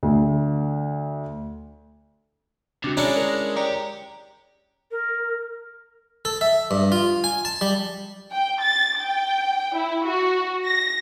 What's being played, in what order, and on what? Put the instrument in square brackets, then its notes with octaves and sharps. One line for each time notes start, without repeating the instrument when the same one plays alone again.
[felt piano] D2
[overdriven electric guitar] C#2 C3 [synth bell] D4 F#4
[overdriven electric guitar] G#3 [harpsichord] C#4 D4 E4 [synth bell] A#5 C#7
[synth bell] A#4
[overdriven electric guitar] G4 [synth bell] C#5 D5 A#5
[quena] A#4
[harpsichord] A4
E5
G2
F4
G#5
A5
G3
[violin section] G5
A6
G5
E4
F#4
A#6